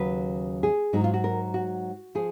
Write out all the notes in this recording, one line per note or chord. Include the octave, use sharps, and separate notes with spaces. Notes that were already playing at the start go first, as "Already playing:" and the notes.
Already playing: D#2 C#3 F#3 B4
G#4
G#2 F#3 D#4
F4
F#4
A#4
F#4
F3 G#4